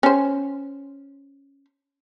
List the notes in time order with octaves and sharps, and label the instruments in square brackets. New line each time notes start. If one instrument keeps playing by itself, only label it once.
[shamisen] C#4 C5